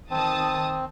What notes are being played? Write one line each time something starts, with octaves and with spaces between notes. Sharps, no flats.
D#3 C4 A5 D#6